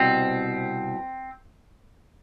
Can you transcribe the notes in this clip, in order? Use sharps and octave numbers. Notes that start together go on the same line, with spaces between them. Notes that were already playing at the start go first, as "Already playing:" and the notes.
Already playing: C2 B2 C4